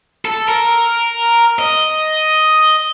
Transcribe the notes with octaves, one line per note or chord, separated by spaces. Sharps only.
A4
A#4
D#5